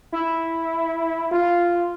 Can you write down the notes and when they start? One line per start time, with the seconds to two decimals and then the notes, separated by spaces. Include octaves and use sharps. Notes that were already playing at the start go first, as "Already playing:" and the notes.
0.12 E4
1.32 F4